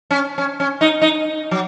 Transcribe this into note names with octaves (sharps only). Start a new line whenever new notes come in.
C#4
C#4
C#4
D#4
D#4
F#3